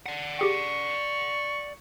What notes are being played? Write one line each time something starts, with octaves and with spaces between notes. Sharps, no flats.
D5 F#5
G4 G#4 G5 C#6